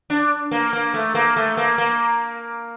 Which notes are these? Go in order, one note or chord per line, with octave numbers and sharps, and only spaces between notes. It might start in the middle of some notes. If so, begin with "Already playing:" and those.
D4
A#3
A#3
A3
A#3
A3
A#3
A#3